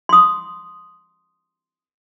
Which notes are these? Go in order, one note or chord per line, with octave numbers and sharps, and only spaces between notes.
C6 D#6